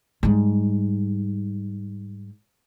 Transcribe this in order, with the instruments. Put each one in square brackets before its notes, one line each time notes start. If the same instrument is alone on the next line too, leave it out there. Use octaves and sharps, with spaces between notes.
[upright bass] G#2 G3